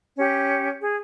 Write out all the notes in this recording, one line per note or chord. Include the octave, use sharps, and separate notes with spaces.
C#4 G4
G#4